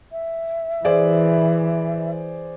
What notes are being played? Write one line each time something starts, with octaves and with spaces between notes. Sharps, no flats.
E5
E3 G#4 C5 D5